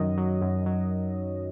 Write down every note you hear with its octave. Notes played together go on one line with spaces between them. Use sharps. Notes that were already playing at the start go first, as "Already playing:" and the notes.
Already playing: F#2 D#3 F#3 D#5
F#3
F#2
F#3